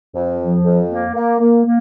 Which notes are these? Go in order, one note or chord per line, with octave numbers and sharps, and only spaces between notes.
F2
F3
F2
A#3
A#3
A#3
A#3